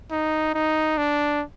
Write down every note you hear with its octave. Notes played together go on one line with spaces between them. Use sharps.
D#4
D#4
D4